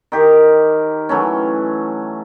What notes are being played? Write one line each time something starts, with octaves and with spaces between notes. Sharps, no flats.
D#3 G4 A#4
E3 F#3 A3 C#4